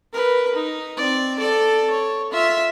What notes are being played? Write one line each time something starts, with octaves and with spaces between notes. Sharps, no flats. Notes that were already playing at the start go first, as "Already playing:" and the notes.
A#4 B4
D#4
C4 D5
A4 D5
C#5
F4 E5